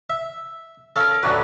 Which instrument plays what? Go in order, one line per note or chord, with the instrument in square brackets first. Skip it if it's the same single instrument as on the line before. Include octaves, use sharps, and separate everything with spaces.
[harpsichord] E5
[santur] C#4 A#4 [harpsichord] A4 F5
[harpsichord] D2 A2 B4 [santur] F#3 C#4 D4